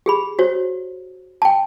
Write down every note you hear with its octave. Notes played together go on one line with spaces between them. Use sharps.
G4 G#4 B5
F#4 C5 C#5
G5 A5